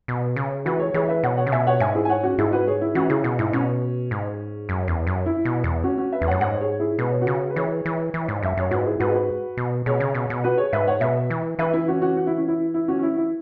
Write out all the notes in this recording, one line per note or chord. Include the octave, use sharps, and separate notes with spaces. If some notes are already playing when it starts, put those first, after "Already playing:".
B2
C#3
E3 F#4 B4
G#4 C#5
E3 G#4 C#5
B4 E5
B2 C#5 F#5
C#5 F#5
C#3
B2 E5 G#5
C#5 F#5
G#2 E5 G#5
E4 G#4
G#5
C#5 F#5
C#4 F#4
G#2 E4 G#4
F#4 B4
G#4 C#5
E4
E3 C#4 F#4
C#3 E4 G#4
B2
G#2 E4
B2 C#4
G#2
F#2
E2
F#2
E4
B2
E2
C#4 F#4
C#4 F#4
B4 E5
E2
F#2 C#5 F#5
G#2 C#5 F#5
G#4 C#5
E4 G#4
B2 B4
C#5
F#4 B4
C#3
B4
E3 G#4 C#5
E3
E3
G#2
F#2 E5
F#2 C#5
G#2 F#4 B4
E4 G#4
G#2 F#4 B4
G#4
F#4 B4
B2
B2 G#4 C#5
C#3
B2
B2
F#4 B4
G#4 C#5
G#2 B4 E5
C#5 F#5
B2 B4 E5
E3
E3 B4 E5
E4
C#4 F#4
C#4 F#4
F#4
E4
C#4
E4
E4
C#4 F#4
C#4
E4
E4